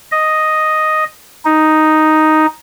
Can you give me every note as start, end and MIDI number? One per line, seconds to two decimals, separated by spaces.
0.12 1.04 75
1.45 2.46 63